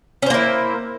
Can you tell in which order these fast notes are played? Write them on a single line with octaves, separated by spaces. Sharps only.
C#4 C5 A#3 E4